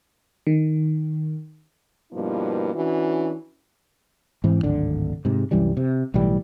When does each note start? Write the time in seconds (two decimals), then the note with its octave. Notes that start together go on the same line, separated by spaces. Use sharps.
0.47 D#3
2.12 G2 B2 F3 A#3 E4
2.74 E3 C#4 D4 F#4
4.44 G#2 E3 C4
4.63 D1 G#1 D3 D4
5.25 G#2 C3
5.51 C2 F#2 E3 G3
5.77 C3
6.14 B1 A2 E3 G3